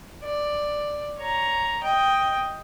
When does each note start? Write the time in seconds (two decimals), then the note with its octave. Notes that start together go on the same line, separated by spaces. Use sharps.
0.24 D5
1.19 C#5 A#5
1.83 D#5 G5